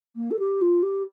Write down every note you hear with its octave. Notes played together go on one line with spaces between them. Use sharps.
A#3
A4
G4
F4
G4